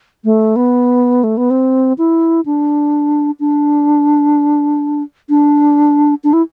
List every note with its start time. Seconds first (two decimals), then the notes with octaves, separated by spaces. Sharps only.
0.25 A3
0.56 B3
1.24 A3
1.37 B3
1.50 C4
1.98 E4
2.46 D4
3.40 D4
5.29 D4
6.24 D4
6.33 E4